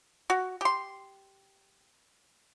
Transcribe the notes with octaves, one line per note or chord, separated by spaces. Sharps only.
F#4
G4 C6